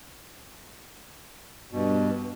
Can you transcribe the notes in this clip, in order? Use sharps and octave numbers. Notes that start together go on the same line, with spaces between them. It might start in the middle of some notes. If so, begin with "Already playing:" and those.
G2 B2